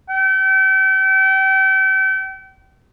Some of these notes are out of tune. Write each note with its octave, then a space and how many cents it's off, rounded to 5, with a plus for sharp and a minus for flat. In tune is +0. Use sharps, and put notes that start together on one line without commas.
G5 -40